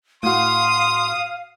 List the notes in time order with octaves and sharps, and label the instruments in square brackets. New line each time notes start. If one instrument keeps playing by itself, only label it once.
[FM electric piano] A2 F#4 [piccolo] F5 [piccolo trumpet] C6 [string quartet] D#6